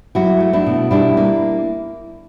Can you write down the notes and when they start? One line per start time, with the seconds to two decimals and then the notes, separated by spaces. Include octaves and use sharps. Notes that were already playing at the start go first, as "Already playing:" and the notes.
0.15 F#3 E4 F#4
0.40 A3
0.53 D4 E4
0.66 B2
0.91 G3 D4 E4
1.17 A#3